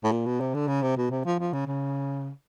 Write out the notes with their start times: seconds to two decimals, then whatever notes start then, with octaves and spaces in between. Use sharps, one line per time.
0.04 A2
0.12 A#2
0.26 B2
0.40 C3
0.55 D3
0.68 C#3
0.82 C3
0.97 B2
1.11 C3
1.25 F3
1.39 F3
1.53 C#3
1.67 C#3